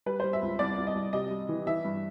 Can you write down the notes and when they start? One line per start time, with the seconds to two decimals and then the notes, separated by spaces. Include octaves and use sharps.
0.06 G3 B4
0.20 G3 C5
0.33 E5
0.42 C#2
0.59 C2 D5
0.78 C2
0.87 D#5
0.95 C2
1.13 C3 D#5
1.30 G3
1.49 E3
1.66 E3 E5
1.85 G2